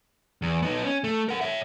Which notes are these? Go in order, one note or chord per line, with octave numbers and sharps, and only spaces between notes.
E2
B3 D#4
C#4
A3
A#4 F#5
C#5 E5